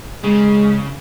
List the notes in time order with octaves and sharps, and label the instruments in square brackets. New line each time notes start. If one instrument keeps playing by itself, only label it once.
[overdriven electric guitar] C#3 [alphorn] G#3